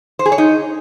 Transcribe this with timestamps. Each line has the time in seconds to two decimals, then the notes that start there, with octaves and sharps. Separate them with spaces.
0.19 C5
0.26 G#4
0.32 C#5
0.38 D#4